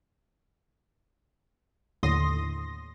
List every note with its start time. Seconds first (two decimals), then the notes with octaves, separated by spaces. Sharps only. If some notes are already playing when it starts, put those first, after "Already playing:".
2.03 D#2 A2 D3 C6 D#6 A#6